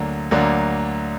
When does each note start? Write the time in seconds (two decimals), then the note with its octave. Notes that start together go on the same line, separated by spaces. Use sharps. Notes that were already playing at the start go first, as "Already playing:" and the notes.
Already playing: D2 D3 F#3 A#3 D4
0.31 D2 D3 F#3 A#3 D4